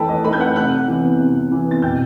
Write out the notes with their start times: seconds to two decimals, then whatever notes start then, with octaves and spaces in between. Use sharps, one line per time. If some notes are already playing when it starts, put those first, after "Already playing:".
Already playing: E3 A3 D#4 A4 B4 G5 A5 B5
0.09 D#5
0.24 A3 D#4 B4 B5
0.33 G6
0.40 F#5 F#6
0.56 C3 F#5 F#6
0.88 E3 B3
1.20 C3
1.51 E3 B3
1.71 A6
1.82 B2 G5 G6